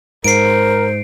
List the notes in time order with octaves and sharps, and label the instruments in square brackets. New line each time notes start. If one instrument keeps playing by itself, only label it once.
[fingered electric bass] G#2 [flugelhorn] A#4 [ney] C5 [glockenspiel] C7 D7